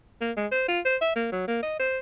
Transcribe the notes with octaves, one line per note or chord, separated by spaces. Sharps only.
A#3
G#3
C5
F4
C5
E5
A#3
F#3
A#3
D#5
C5